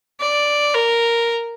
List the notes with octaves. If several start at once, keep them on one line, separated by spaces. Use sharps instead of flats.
D5
A#4